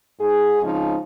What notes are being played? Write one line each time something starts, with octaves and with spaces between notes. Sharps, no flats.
G#2 G#4
C#3 F3 G#3 C4 D#4